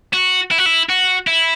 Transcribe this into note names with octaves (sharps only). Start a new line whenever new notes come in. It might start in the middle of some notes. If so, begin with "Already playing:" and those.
F#4
E4
F#4
E4
F#4
E4